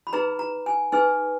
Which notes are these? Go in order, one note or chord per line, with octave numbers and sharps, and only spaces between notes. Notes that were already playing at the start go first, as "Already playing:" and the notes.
B5
D#4 G#4 B4 A#5
A#5
G#5
D#4 G#4 B4 G#5